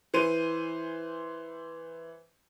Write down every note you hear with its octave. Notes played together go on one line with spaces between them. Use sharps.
E3 C5 D#7